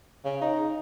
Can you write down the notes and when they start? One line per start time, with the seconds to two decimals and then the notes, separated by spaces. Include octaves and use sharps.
0.25 C#3
0.42 D#4